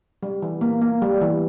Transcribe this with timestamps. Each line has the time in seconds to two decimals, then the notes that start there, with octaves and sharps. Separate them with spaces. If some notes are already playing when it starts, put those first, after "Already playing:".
0.23 G3
0.42 E3
0.61 A#3
0.81 A#3
1.02 G3
1.21 E3